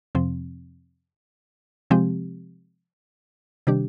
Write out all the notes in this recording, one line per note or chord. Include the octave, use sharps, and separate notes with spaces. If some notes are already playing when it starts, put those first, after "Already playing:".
F2 C3 F3 C4
C3 F3 G#3 C4 G4
C3 D#3 G3 D4 G4